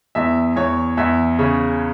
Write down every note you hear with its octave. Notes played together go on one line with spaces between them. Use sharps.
E2 E5
E2 C#5
E2 E5
C#3 C#5